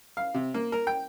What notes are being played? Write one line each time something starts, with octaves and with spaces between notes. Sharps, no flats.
F5
C3
A#3
A#4
G5